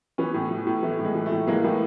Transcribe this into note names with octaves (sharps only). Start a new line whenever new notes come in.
E3 B3 C#4
A2
E3
A2
E3 A3
A2
G#3
E3
A3
A2
E3 G#3 A#3
A2 A3 B3